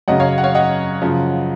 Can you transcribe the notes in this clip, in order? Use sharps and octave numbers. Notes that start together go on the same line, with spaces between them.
F#2 C#3 F#3 D#5 F#5
C#5 F5
F#5
C#5 F5
D#5 F#5
F#2 C#3 F3